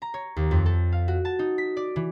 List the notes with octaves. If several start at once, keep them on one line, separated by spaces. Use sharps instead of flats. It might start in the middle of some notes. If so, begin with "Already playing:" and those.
A#5
C#5
D#2
F2
A4
F5
F#4
A5
D#4
B6
D5
E3